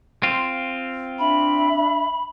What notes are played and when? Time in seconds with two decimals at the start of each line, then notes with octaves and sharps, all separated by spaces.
0.23 C4 F4
1.19 D4 E5 B5